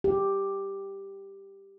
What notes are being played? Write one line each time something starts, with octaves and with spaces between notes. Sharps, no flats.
G4